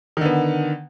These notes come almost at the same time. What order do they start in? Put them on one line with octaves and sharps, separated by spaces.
D#3 D3 B3